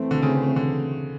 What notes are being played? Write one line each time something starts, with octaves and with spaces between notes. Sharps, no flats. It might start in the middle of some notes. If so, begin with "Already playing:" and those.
Already playing: E3 A3 C4
D3
C#3
D3